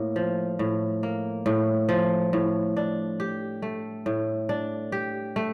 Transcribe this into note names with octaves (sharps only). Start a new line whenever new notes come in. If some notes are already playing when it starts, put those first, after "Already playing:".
Already playing: A2 A#3
F3
A2
A#3
A2
F3
A2
D4
G4
A3
A2
D4
G4
A3